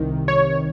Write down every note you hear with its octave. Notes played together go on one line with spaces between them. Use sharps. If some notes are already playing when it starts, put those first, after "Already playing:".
Already playing: C2 C3 D#3
C#5